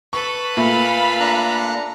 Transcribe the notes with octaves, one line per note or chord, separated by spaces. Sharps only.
A4 B4 C#6
A#2 A3 F5 B5
D4 A#5 F#6